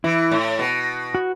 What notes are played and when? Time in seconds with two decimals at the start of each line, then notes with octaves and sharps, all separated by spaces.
0.04 E3 E4
0.31 A2
0.59 B2
1.15 F#4